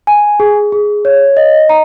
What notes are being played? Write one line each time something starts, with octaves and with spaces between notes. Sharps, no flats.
G#5
G#4
G#4
C#5
D#5
A#5